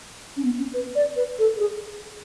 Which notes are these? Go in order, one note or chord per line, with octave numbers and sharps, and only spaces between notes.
C#4
B3
C#4
B4
D5
B4
A4
A4
G#4